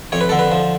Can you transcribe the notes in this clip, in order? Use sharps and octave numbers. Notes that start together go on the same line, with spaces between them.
F2 C#5
B4
D3 A4
B4
F3